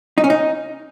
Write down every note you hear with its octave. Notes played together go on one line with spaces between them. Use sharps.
D#4
C#4
D#4